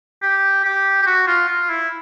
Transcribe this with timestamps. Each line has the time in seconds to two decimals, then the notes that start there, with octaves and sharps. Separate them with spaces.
0.23 G4
0.65 G4
1.02 G4
1.06 F#4
1.27 F4
1.48 F4
1.70 E4